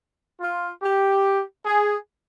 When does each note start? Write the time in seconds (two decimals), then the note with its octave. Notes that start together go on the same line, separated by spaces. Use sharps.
0.41 F4
0.82 G4
1.66 G#4